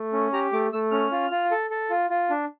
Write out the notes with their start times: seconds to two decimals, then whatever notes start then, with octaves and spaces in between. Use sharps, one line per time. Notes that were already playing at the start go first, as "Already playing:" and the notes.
Already playing: A3
0.13 C#4
0.33 G4 A#5
0.53 A3 D6
0.73 A3 E6
0.91 C#4 F6
1.12 F4
1.31 F4
1.51 A4
1.70 A4
1.90 F4
2.10 F4
2.30 D4